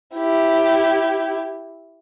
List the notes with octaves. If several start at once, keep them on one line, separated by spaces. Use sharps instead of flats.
E4 G4